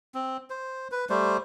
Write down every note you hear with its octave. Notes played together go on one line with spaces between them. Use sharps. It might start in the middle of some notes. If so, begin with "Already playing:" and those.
C4
C5
B4
G3 A3 C5